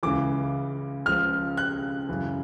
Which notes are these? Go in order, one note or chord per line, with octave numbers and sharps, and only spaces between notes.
C#2 C#3 E3 D6
C#2 C#3 F3 F6
F#6
F#2 C#3 E3